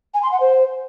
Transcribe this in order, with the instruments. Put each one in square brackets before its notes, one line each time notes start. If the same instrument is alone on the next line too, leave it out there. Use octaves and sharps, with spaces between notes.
[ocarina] G#5
C6
F#5
C5